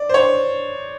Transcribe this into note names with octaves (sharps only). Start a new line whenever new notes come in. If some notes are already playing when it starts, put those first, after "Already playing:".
Already playing: D5
C5
C#5